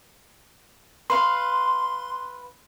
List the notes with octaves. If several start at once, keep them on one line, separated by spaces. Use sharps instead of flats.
B4 F5 C6